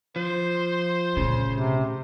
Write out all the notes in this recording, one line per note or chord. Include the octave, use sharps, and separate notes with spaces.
F3 C5
A#2 C#3 A3
C3